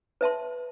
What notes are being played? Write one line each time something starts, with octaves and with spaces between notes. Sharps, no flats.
B4 E5 A5 C6